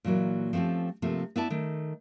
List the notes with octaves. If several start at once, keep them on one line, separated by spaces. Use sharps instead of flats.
A#2 E3 F#3 A#3
F3 A3 C4 C#4 G4
C3 F3 A3 A#3
B3 E4 D5 A5
D#3 A3